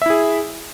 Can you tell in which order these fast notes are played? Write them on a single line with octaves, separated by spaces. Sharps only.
E5 E4 G#4